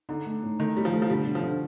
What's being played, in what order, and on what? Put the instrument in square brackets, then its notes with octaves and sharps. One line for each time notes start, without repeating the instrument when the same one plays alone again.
[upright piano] D3 [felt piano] D#4
[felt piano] A3
A2
[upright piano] D#3 [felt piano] A3
[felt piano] A2 [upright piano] G3
[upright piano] F3
[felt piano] A3
[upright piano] F3
[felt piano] D3 [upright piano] G3
[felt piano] D3
[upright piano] F3
[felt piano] D3